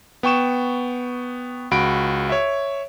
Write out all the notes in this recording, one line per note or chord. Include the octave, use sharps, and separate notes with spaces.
B3 G5 C#6 E7
C#2 F#4 B5 D7
C#5 E5